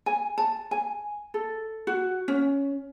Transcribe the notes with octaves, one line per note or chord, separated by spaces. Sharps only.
G#5
A5
G#5
A4
F#4
C#4